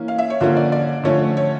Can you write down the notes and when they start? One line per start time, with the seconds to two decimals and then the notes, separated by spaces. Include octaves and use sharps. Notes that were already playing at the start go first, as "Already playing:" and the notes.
Already playing: E3 A#3 C#4
0.08 F5
0.18 E5
0.30 C#5
0.40 D3 F3 A#3 C#4 F4
0.57 D5
0.72 D5
1.04 D3 F3 A3 C#4 C#5
1.37 C#5